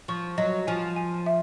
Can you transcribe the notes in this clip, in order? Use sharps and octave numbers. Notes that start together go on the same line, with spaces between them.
F3 C#6
F#3 D#5
F3 G#5
G#5
E5